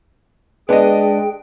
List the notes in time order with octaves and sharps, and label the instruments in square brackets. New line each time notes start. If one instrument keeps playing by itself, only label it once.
[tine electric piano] G#3 D4 [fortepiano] B3 D#5 [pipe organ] G#4 G5